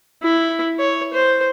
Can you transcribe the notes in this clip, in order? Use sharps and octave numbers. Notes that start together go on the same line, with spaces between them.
E4
C#5
C5